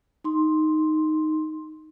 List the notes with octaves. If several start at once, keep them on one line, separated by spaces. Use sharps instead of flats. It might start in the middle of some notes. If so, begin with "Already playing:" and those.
D#4 C6